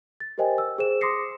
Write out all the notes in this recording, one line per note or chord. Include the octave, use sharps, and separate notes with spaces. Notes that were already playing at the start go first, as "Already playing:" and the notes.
A6
G4 A#4 C5 D#5 G5 G#5
E6
G#4 C5 E7
C6 D6 D#6 A#6 C7 C#7